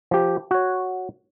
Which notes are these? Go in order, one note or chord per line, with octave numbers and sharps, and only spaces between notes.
F3 G4
F#4 C#5